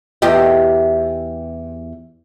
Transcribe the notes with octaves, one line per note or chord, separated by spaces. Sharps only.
E2 G4 D#5